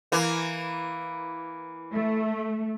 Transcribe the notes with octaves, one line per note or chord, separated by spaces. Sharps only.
E3 A#3
A3